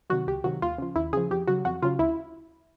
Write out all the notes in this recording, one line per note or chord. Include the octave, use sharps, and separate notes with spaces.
C3 D#3 F#3 F#4
C#2 G4
C3 D#3 F#3 F#4
D#2 F4
C#3 F3
D#2 E4
C#3 F3 G#4
F2 G4
C#3 F#3 F#4
F2 F#4
C#3 F#3 F4
D2 E4